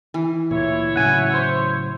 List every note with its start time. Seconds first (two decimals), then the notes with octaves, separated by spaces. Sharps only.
0.14 E3
0.51 D2 A#2 E4 C#5
0.96 A2 C#3 F#3 F#5 G#5
1.34 C5